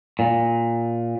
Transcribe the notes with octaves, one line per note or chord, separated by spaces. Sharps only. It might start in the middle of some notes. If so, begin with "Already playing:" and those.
A#2